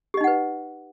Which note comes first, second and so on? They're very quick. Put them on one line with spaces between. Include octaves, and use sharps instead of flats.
G4 D#5 D#4 F#5 B4